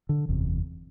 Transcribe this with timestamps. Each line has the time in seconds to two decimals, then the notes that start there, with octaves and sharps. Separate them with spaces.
0.09 D3
0.28 F#1 E2 C3